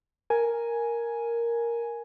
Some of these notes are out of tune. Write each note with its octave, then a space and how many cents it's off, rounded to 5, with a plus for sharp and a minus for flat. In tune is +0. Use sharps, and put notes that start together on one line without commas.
A#4 +0 G#5 +5